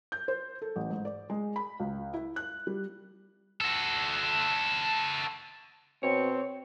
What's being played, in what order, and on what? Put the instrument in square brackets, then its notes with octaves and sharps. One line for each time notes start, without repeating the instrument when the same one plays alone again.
[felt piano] G6
C5
A4
A1
G#2
D5
G#3
B5
C#2
E4
F#6
G3
[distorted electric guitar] F#4 A4
[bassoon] B2 [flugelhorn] C4 [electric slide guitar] C#5